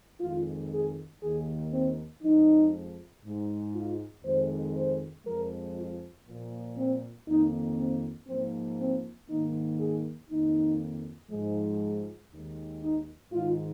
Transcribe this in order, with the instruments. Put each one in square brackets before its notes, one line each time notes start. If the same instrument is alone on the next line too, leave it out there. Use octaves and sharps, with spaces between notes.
[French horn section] F2 D#3 G#3 F4
G#4
D#2 D#3 A#3 G#4
C4
F2 F3 G#3 D#4
G#2 G#3
F4
F2 D#3 G#3 C5
C5
F2 F3 G#3 A#4
F4
A#2 F3 A#3
C4
F2 D#3 A#3 D#4
C4
G#2 F3 A#3 C4
C4
G#2 D#3 A#3 D#4
G#4
F2 D#3 A#3 D#4
G#2 F3 G#3
D#2 D#3 G#3
D#4
G#2 D#3 G#3 F4